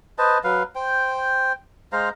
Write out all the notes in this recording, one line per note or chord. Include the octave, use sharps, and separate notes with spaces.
B4 C5 D#5 A5
F#3 B4 F5
C5 G5
G#3 C5 F5 A#5